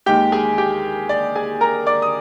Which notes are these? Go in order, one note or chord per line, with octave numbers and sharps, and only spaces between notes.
D#2 D#3 G#3 G4 G5
G#4 G#5
G4 G5
D5
G#4 G#5
A#4 A#5
D5 D6
D#6